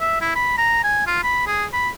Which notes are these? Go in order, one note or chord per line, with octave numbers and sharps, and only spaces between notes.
E5
E4
B5
A#5
G#5
F4
B5
G#4
B5